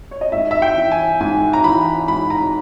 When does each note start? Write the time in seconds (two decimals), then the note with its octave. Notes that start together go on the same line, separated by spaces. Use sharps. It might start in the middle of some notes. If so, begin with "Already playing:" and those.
0.11 C#5
0.21 D#5
0.32 G#2 E5
0.51 E5
0.62 G5
0.76 E3
0.92 G#5
1.21 G#2 G#5
1.53 A#5
1.64 E3 B5
2.08 G#2 B5
2.30 A#5